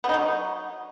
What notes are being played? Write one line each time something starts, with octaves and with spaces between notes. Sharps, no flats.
B3
D#4
F#3